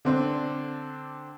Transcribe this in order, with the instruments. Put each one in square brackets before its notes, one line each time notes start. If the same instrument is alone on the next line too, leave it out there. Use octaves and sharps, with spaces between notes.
[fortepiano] D3 C4 D4